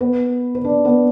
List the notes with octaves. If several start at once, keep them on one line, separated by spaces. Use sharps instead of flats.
B3 B4
B4
D4 D5
B3 B4